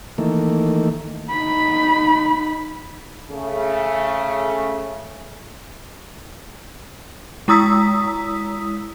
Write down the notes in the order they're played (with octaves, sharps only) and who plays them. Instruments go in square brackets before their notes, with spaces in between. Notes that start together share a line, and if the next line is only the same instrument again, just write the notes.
[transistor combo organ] D#3 E3 A3 A#3
[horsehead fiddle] D#4 B5
[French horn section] C#3 A3
[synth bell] G#3 E4 A#5 D#6 E6 B6